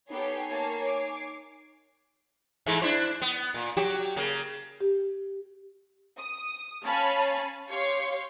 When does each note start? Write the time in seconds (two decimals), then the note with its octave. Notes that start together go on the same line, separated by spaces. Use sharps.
0.10 B3 D#4 G4 A4 C#5 G#5 C7
0.49 A#3 A5
0.84 D6
2.66 G#2 E3 A3
2.82 D4 E4 C5
3.21 B3
3.54 A#2
3.77 F#3 F#4 G4
4.16 C#3 A#3
4.81 G4
6.19 D#6
6.85 C#4 C#5 F5 G#5 A5 B5
7.71 G4 C#5 F5 C6 C#6